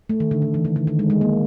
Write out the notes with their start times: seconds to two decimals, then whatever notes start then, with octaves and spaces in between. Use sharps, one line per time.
0.09 A3
0.20 D#3
0.31 D3
0.42 D#3
0.54 E3
0.65 D#3
0.76 D3
0.87 D#3
0.99 G#3
1.10 G#3
1.21 A#3